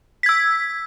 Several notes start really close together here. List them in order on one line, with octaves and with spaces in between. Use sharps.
B6 G#6 E6